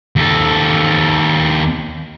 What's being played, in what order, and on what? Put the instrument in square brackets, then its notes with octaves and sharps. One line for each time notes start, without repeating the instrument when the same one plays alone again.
[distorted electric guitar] D#2 A4